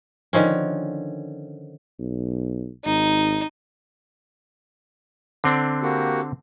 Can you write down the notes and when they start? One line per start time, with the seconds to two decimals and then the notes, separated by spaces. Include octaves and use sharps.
0.33 D3 D#3 F3 C#4
1.99 B1
2.85 G#1 D#4
5.44 D3 C4 D4
5.82 A#3 F#4 G4